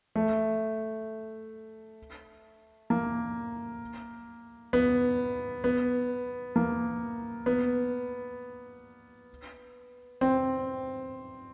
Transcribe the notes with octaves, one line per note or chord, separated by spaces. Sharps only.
A3
A#3
B3
B3
A#3
B3
C4